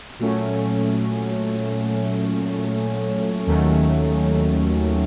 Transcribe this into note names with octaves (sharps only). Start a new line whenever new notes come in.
A#2 F#3 A3 C#4
D#2 D#3 F#3 A3 C#4